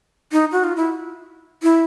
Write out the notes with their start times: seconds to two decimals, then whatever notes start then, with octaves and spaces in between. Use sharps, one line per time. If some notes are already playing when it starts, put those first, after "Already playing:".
0.32 D#4
0.52 F#4
0.64 F4
0.76 E4
1.63 E4